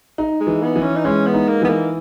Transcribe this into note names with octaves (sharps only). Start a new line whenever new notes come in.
D#4
G#3
E3
B3
E3
C#4
D#4
G#3 C#4
B3
D#4
A#3
E3 B3
A#3